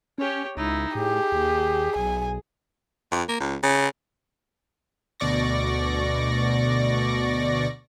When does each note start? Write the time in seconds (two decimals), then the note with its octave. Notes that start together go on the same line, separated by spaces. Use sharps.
0.18 C#4 G4 C#5
0.57 C#2 D#4 E4
0.95 A2 G4 G#4
1.32 D#2
1.96 B1 G#5
3.12 F2
3.28 A#3
3.40 C#2
3.63 C#3
5.20 D2 B2 D5 C#6 A#6